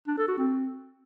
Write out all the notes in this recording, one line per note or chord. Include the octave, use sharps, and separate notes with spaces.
D4
A4
F#4
C4